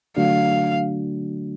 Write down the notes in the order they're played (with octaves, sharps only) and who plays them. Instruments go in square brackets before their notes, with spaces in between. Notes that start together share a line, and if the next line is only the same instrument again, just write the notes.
[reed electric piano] D3 F#3 A3 D4 F#4 [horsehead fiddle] F5